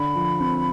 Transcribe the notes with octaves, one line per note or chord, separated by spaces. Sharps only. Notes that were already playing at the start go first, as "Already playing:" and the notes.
Already playing: D3 B5
F3
C4